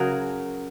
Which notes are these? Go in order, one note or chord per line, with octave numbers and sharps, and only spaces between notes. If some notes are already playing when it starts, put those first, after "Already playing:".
Already playing: C#3 F#3 F#4 G#4 A#4